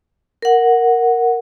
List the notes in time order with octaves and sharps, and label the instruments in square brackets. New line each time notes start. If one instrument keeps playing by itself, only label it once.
[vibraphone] A#4 F#5